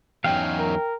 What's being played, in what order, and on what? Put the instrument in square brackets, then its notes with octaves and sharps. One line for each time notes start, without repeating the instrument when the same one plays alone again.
[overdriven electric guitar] E2 F#3 [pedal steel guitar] C#4 D#4 F5 [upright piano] G5
[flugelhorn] A#4